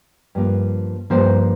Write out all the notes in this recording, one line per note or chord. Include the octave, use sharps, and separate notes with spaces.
G2 F3 A#3
G2 F3 A#3 C5